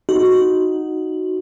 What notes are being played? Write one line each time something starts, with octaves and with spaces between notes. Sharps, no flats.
D#4 F#4